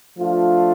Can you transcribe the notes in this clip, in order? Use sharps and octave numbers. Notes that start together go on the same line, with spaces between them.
F3 A3 D4 F4